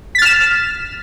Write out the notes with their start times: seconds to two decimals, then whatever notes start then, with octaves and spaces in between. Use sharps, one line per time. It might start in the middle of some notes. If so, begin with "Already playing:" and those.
0.15 B6
0.18 A6
0.22 F6
0.25 E7